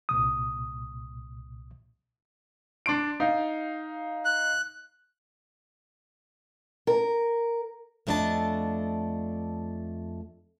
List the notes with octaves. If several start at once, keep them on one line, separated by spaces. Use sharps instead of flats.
C2 A#2 D#6
D4 C6 D7
D#4 F5
F#6
A#4
F2 A3 D4 D#5 A5